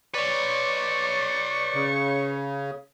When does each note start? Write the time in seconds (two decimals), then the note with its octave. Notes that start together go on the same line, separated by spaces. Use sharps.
0.14 B4 C#5 D5 C#6
1.74 C#3